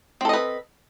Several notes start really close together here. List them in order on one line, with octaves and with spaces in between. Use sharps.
C4 A4 D#5 B4